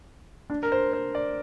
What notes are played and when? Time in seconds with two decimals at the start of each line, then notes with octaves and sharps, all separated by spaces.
0.50 D4
0.63 A#4
0.72 C5
0.93 C5
1.15 D5